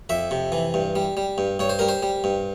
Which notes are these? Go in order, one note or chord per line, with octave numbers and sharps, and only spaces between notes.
F2 E5
C3
E3
G2
G3
G3
G2
G2 C#5
C5
G3 A#4
C5
G3
G2